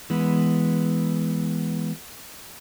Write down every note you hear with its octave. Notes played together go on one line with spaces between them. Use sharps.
E3 G#3 B3